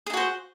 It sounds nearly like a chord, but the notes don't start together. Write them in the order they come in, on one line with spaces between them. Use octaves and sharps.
G#4 D#4 F#4 C5